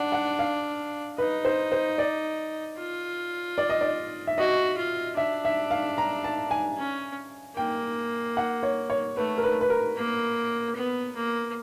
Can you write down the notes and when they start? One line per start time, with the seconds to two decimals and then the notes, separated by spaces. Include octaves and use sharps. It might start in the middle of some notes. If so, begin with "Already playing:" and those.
Already playing: D4 F#5
0.12 F#5
0.39 F5
1.18 D#4 B4
1.45 C5
1.72 C5
1.98 D5
2.79 F4
3.58 D5
3.69 D#5
3.81 D5
4.27 E5
4.38 F#4 D#5
4.78 F4
5.17 D4 E5
5.45 E5
5.71 F5
5.98 A#5
6.24 A5
6.51 G#5
6.77 C#4
7.57 A#3 G5
8.37 F#5
8.63 C#5
8.90 C#5
9.17 A3 B4
9.38 A#4
9.44 B4
9.61 B4
9.70 A#4
9.97 A#3
10.76 B3
11.16 A#3